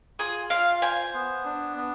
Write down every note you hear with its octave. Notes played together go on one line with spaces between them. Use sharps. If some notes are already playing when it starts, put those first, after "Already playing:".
F4 G#4
F4 F5
C5 G#5
B3
D4
B3